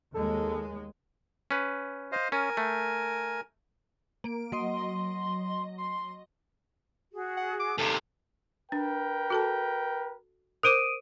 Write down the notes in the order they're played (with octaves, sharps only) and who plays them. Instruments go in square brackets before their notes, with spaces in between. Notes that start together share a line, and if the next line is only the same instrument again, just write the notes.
[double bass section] D#2 G#3 [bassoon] A4
[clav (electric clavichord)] C#4 B4
[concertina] C5 D#5 F5
[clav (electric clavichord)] C#4 [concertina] A#4 G#5
[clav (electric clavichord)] A3
[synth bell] A#3 D7
[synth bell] F#3 D#5 [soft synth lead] C6
[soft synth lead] C6
[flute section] F#4 G#4
[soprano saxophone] F#5
D6
[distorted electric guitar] D#2 C3 [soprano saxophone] A4
[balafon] D4 [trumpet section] A#4 B4 G5
[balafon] F#4 A4 A5
[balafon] A#4 C5 D6 [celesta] D#6 D7 D#7